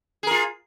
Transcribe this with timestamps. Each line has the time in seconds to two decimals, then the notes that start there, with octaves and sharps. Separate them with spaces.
0.23 G#4
0.27 A#4
0.31 F4